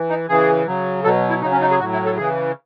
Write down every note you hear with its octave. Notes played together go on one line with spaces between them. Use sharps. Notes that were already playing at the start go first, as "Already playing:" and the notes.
Already playing: E3
D#4
C#3 E3 G#4
C#3 F#3
B2 F#3 A4
E4
C#3 F#3 D#4
C#4
D#4
G#4
A2 F#3 F#4
E4
A4
C#3 E3 G#4